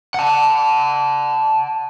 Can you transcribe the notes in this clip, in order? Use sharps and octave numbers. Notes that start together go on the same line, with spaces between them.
F#5 A5